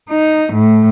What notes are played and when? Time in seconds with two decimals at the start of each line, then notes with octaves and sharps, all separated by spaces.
0.10 D#4
0.53 A2